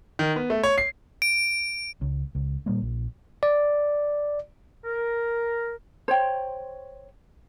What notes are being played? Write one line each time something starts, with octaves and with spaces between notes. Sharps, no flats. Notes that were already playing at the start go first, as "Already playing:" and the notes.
D#3
B3
A3
C#5
C7
D7
C#2
C#2
A#2 G3 A#3
A#1
D5
A#4
C5 C#5 G5